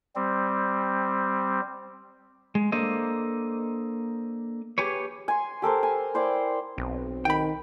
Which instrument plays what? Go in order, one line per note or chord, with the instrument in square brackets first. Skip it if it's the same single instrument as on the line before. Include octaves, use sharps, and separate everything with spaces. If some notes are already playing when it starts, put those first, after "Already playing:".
[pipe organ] G3 C4
[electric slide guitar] G#3
A#3 D4 A4 C5 D#5
G4 G#4 B4 C#5
[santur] G#5 C6
G4 A4 A#4 C5
G#5
E4 C5 D5 G5
[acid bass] B1 [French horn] C4
[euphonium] D#3 [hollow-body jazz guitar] G5 B5